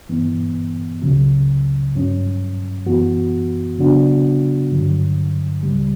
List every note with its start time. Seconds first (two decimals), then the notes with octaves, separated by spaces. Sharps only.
0.09 G2 E3 B3
1.02 C#2 C#3 F#3
1.94 G2 F#3 C#4
2.86 F#2 E3 B3 F#4
3.78 C#3 F#3 B3 D4 F#4
4.71 G2 D3 F#3
5.63 C#2 C#3 G3